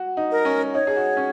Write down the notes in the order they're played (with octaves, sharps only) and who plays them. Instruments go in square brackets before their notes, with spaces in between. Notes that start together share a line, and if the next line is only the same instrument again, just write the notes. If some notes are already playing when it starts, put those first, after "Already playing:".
Already playing: [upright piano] F#4
D#4
[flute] A#4
[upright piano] C#4
[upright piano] D#4 [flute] C#5
[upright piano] G#4
F#4
C#4